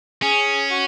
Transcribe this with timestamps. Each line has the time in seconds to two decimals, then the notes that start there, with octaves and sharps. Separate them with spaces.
0.23 C#4 G#4
0.71 F#4